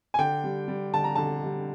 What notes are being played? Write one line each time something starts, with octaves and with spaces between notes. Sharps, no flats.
G#5
D3 G5
G3
G3
D3 A5
A#5
D3 A5
G3